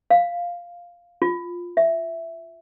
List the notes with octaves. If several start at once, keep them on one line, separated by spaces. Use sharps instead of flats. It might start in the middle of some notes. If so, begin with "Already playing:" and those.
F5
F4
E5